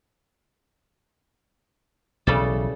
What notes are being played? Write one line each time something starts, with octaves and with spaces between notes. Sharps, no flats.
B1 C#3 E3 G3 A4